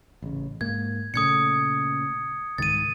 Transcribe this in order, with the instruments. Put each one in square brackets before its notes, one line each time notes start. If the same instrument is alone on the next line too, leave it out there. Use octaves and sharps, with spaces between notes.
[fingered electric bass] A1 C#3
[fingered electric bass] G#2 A#3 [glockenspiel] G#6
[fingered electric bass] A#2 C#3 A3 [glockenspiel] D#6 G#6 C#7
[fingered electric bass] C2 G#2 D#3 [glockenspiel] A6 D#7